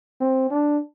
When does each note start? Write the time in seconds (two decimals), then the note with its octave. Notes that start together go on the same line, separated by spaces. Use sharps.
0.21 C4
0.51 D4